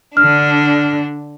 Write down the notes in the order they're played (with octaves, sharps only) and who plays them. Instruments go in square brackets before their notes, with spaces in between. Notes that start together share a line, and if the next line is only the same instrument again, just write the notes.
[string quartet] D3 D4 [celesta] F6